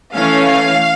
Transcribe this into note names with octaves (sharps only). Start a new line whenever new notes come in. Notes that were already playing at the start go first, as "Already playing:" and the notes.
E3 A3 C#4 F5